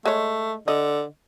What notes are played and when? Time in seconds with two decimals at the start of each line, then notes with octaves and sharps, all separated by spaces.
0.06 G#3 A3 C#5
0.68 D3 D#5